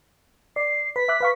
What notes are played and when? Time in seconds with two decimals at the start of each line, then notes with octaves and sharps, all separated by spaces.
0.56 D5 C7
0.96 B4 B6
1.08 E5 D6 F#6
1.20 B4 F5 C#6